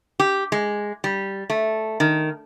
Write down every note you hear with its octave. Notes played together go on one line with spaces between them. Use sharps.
G4
G#3
G3
A3
D#3